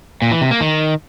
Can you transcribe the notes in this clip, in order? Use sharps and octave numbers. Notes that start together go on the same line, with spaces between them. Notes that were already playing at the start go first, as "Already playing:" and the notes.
A#2
E3
C3
A#3
D#3